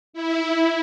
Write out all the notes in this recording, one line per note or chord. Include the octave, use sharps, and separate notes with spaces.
E4